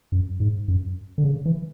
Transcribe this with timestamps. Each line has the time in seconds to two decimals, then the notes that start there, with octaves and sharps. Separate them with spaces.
0.12 F#2
0.40 G#2
0.68 F#2
1.18 D3
1.25 C#3
1.45 E3